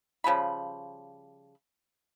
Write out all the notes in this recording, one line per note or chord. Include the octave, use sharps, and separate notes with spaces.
C#3 F3 G3 B5